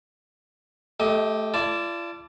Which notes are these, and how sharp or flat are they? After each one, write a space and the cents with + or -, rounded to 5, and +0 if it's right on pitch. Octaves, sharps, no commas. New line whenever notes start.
A3 -10 G4 +0 D#5 +25
F4 -45 D5 -10 A5 +0